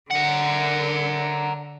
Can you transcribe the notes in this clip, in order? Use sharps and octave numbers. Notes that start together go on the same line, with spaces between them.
D3 A#4 F#5